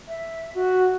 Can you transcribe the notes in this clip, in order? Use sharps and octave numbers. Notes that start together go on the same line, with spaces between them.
E5
F#4